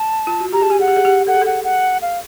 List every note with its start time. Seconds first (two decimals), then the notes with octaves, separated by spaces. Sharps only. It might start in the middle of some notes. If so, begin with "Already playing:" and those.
Already playing: A5
0.27 F4
0.40 F#4
0.52 G4 A#5
0.61 G#4 A5
0.70 G4 G#5
0.79 G#4 F#5
0.88 G4
0.96 G#4
1.05 G4
1.27 A4 F#5
1.34 G#4
1.42 A4 F#5
1.64 F#5
2.02 F5